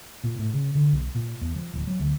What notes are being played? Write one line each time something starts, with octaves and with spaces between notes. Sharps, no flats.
A#2
A2
C#3
D3
B1
A#2
E2
F3
D1
F#3
D2